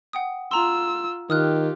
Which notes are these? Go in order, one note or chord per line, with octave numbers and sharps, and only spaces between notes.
F#5 G5 D#6
F4 A#5 C6 E6
D#3 F4 G4 D#6 F6 F#6